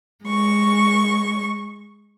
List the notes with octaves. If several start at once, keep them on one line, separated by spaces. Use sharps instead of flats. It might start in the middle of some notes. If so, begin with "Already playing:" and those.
G#3 C#6